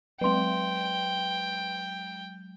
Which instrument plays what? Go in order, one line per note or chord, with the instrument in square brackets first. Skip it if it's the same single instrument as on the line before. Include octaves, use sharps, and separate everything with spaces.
[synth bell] F#3 G#3 [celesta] B4 C6 [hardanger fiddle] G5